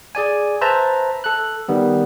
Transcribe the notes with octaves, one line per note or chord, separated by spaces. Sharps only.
G#4 D5 G#5
B4 C5 E5 A5 A#5
A4 F#6
D#3 G3 B3